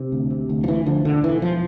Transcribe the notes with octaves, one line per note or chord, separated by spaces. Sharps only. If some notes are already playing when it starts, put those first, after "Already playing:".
Already playing: C3
D2
C3
D2
F3
D2 E3
D3 F3
E1 D3
E1 E3
F3